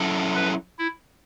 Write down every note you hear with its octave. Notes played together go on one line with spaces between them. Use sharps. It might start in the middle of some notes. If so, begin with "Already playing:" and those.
Already playing: F#3 C#4 E4 A4
B4
E4